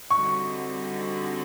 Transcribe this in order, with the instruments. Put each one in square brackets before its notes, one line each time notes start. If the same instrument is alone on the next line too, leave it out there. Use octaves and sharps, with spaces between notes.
[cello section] D3 G3 C4 D#4 F#4 [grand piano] C#6